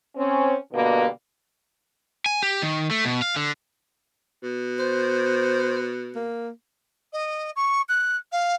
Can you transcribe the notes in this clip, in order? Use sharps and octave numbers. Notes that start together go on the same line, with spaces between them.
C4 C#4
B2 D3 G3 A#3
G#5
G4
D#3
A3
B2
F5
D3
B2
C5
A#3
D#5
C#6
F#6
F5